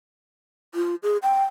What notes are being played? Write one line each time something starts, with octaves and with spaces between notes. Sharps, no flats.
F4
G#4
G5